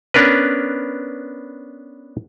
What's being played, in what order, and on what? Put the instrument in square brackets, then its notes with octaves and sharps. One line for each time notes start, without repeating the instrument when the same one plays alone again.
[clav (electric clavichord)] B3 C#4 D4 A#4 B4